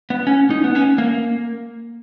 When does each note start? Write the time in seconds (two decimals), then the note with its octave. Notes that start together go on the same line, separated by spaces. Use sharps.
0.10 B3
0.27 C#4
0.50 D#4
0.64 B3
0.75 C#4
0.98 A#3